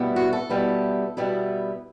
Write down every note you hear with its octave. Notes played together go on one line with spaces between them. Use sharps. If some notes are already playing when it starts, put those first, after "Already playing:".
Already playing: B2 G3 B3 E4
F#4
A4
B2 G3 B3 E4
B2 G3 B3 E4